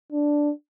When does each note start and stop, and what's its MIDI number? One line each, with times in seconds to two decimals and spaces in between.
0.12 0.51 62